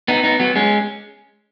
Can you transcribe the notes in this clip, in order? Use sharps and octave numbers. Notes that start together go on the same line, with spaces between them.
B3 D#4
B3 D#4
F#3 B3
G#3 C#4